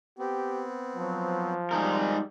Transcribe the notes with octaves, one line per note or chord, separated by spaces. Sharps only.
B3 C4 G4
F3 F#3
G3 G#3 D#4 A#4